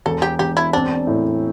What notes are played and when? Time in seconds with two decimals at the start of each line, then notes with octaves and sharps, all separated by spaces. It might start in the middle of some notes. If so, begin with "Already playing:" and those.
0.06 E1 A4
0.22 G4
0.39 E1 G4
0.57 E4
0.73 C4 D4
1.07 A2